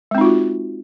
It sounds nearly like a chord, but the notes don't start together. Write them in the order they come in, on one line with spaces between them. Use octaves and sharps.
G#3 C4 D#4 F4 F#4